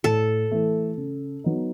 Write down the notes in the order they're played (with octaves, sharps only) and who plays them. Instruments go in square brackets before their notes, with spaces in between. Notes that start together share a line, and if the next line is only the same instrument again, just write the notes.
[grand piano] A2 [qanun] A4
[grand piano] E3 A3
C#3
F#3 B3 D#4